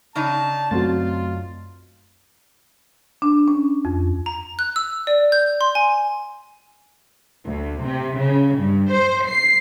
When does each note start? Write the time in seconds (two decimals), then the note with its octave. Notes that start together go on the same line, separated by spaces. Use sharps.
0.15 C#3 D4 D#4 A5
0.71 F#2 A3 C4 F4 F#4 A6
3.22 D4
3.48 C#4
3.85 F2
4.26 A#5
4.59 F#6
4.76 E6
5.07 D5
5.32 G6
5.61 C6
5.75 G#5
7.45 D2
7.81 C3
8.16 C#3
8.58 G2
8.90 C5
9.26 C7